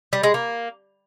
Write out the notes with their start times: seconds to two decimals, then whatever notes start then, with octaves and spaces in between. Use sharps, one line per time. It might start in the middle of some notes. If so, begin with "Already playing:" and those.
0.13 G3
0.23 G#3
0.34 A#3